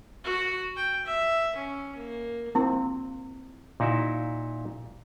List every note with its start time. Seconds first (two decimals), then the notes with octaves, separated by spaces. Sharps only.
0.24 F#4
0.76 G5
1.05 E5
1.55 C#4
1.95 A#3
2.55 A#3 C4 E4
3.80 A#2 D#4 E4 F#4 E5